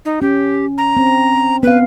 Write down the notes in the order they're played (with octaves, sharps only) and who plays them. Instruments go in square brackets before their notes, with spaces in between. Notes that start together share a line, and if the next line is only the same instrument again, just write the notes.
[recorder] D#4
[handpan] C#4 [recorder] G4
[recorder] A#5
[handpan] C4
[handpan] B3 F5 [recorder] B4